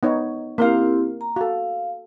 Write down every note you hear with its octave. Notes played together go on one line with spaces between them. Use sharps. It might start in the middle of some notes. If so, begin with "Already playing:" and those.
B3 D#4 C#5
A#3 C4 E4 G4 A#4 F5
A#5
F#4 A4 F5